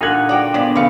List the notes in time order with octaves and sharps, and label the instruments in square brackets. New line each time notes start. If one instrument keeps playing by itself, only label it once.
[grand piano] A#2 D3 G#6 [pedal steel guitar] D#4 F#5
[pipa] F#4 D5 [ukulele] G#4 G5
[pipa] F3 G#3 D5 [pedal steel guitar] A#3 B3 D4
[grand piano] C#3 A3 C#7 [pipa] B4 F5